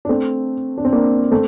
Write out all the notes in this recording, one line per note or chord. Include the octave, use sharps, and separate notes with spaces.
D4
A3 C4
D4
C4
A#3 D4
A3 C4